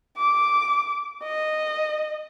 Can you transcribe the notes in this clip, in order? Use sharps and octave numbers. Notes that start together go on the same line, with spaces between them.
D6
D#5